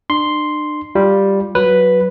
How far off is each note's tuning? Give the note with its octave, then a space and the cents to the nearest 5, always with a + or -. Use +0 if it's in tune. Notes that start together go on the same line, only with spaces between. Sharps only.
D4 +40 C6 +0
G3 +0 F4 +0
F#3 +0 B4 +0